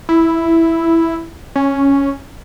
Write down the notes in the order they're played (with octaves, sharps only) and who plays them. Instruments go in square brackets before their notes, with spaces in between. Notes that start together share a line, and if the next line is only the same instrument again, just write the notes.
[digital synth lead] E4
C#4